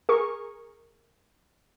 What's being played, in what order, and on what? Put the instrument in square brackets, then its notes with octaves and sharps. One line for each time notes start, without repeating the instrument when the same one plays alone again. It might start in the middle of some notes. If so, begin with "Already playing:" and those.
[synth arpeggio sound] G#4 A#4 C#6